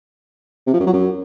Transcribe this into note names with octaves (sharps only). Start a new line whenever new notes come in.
C3
F3
F#2
F#3
F#2